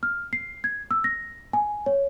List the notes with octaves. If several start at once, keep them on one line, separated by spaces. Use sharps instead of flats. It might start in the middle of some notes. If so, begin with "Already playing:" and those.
F6
C7
G#6
E6
A#6
G#5
C#5